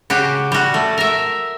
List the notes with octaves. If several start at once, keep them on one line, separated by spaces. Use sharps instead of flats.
C#3 F#4 G4
G3 F#4
A3
A#4 E5